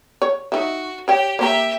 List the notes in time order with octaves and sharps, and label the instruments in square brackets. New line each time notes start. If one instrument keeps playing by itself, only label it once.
[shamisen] C#5
[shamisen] D#4 E5 [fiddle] F#4
[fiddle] G4 [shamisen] C#5 G5
[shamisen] A#3 C5 A#5 [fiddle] G4 E5